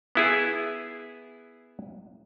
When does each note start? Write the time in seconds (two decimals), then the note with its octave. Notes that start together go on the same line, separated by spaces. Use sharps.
0.15 B3 E4 G#4